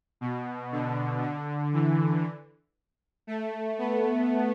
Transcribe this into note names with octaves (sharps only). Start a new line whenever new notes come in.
B2
D3
D3
E3
A3
B3